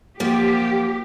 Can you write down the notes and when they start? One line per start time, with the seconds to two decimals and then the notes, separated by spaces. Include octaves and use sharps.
0.20 F#2 F3 A#3 G4